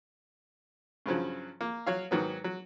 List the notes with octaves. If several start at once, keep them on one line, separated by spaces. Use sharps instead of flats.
G2 C#3 F3 F#3
A#3
F#3 C#5 F5
G#2 D#3 F#3 B3
F#3